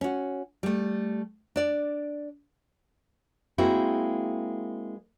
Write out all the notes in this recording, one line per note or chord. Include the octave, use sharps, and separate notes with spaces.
C#4 F#4
G3 A3
D4 D5
G#3 A#3 C4 E4 F#4